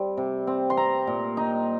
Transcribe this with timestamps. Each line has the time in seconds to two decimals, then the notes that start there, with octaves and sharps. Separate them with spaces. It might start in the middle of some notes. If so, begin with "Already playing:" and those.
Already playing: G3 C4
0.17 C3
0.47 C4
0.70 C6
0.77 C4 A#5
1.07 A#2
1.37 D#4